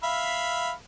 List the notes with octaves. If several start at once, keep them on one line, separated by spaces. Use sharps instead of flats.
E5 F5 B5